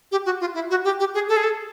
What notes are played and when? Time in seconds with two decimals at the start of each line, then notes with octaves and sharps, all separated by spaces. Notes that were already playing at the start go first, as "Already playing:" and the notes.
0.12 G4
0.26 F#4
0.41 F4
0.55 E4
0.70 F#4
0.84 G4
1.00 G4
1.14 G#4
1.29 A4
1.37 G#4
1.43 A4